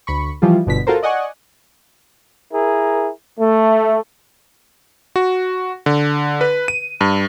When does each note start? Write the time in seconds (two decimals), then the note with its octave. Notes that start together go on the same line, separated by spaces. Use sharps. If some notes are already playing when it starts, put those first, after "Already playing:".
0.07 D2 B5 C#6
0.42 E3 F3 G3 F4
0.67 G1 B2 D3 B6
0.87 F4 F#4 A4 A#4 C5
1.03 D5 D#5 F#5 G#5 C#6
2.53 E4 G#4 A#4
3.39 A3
5.16 F#4
5.86 D3
6.41 B4
6.68 D#7
7.01 G2